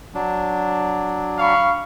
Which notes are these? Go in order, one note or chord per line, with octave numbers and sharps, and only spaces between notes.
F#3 D4
F5 B5 C#6